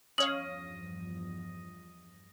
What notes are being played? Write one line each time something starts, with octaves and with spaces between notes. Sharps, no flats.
E2 G2 F3 C#4 C#5 D#5 F5 F#7